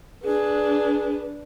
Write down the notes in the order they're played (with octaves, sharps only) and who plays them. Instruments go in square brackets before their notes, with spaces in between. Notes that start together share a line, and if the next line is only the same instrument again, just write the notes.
[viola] D4 B4 [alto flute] G#4